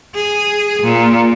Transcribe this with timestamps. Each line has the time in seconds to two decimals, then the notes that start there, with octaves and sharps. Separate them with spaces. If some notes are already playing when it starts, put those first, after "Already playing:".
0.15 G#4
0.83 A#2